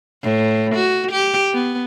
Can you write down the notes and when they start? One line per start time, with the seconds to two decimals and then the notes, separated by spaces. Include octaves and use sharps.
0.23 A2
0.75 F#4
1.12 G4
1.54 B3